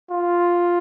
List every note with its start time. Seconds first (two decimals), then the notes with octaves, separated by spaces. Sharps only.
0.11 F4